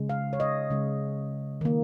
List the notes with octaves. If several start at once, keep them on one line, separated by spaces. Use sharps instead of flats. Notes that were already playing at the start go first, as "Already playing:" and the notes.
Already playing: C#3 G#3
F5
C#5
D#5
C#3 G#3
D#3 A#3